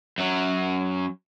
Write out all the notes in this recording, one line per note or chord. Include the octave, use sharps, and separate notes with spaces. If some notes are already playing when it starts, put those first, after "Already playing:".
F#2 F#3